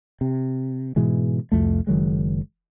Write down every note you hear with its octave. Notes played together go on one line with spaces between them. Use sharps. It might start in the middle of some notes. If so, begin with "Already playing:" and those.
C3
G#2 B2 E3 G#3
C2 F2 A3
F#1 D#3 F#3 G#3